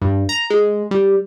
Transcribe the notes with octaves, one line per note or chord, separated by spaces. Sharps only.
G2
A#5
G#3
G3